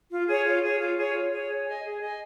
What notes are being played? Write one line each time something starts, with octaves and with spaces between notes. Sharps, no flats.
F4
G#4 C#5
F4
G#4 C#5
F4
G#4 C#5
F4
G#4 C#5
G#4
D#5 G#5
G#4
D#5 G#5